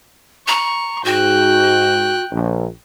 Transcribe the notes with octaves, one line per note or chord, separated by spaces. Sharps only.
A#5 C#6
G#2 F#4 G5 F#6
A#1